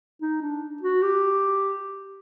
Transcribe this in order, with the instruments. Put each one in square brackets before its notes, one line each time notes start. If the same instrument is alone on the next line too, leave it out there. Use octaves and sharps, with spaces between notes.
[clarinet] D#4
D4
F#4
G4